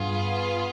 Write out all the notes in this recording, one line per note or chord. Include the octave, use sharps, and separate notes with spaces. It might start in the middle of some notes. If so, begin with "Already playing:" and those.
Already playing: G2 B3 F4 G#4